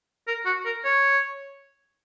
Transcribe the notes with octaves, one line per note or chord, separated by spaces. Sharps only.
A#4
F#4
A#4
C#5